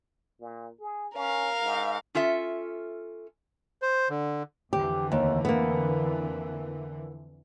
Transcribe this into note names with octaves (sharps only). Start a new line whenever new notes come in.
A#2
G#4
C#4 A#4 F5
G#2
C#4 F4 A4 E5
C5
D3
F2 D3 E3 G4
D#2
A#3 B3